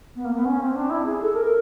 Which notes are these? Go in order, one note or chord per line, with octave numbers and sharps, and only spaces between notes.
B3
A#3
B3
C#4
C4
D4
E4
G#4
A4
A#4